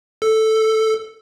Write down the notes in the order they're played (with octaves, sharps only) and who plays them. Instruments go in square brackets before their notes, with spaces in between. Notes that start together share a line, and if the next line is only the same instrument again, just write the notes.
[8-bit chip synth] A4